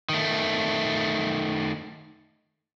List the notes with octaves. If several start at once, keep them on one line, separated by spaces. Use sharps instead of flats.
D#3 A3